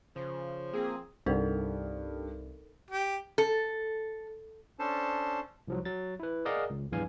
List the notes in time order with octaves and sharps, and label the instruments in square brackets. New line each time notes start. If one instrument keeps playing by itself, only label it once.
[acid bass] C#3 [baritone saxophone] F3
[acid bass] A#3 [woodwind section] C4 G#4
[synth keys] C2 C3 [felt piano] G2 [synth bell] D#4 A4 A#4
[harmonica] G4
[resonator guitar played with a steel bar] A4
[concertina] C#4 D4 A4 C5 A5
[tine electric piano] C2 F3 F#3
F#3 A6
E4 B4
G#4 A#4 D5 D#5 F5 F#5
C#2
A#1 E2 G2 E3 F5 G#5